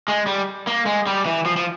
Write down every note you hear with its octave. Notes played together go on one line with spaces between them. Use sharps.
G#3
G3
A#3
G#3
G3
E3
F3
F3